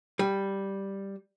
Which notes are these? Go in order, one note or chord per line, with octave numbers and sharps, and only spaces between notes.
G3